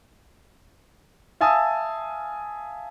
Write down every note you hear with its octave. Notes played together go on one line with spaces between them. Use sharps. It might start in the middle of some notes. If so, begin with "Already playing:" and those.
E5 F5 G#5 A5 D#6 E6